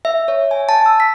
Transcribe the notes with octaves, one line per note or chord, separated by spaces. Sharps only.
E5
C#5
G#5
A5
E6
B6